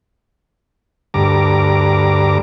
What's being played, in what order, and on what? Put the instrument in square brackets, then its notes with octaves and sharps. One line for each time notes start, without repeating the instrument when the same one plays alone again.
[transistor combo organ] D2 G2 A#5 D6